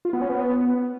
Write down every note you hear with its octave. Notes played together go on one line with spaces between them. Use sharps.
F4
B3
C#4
B3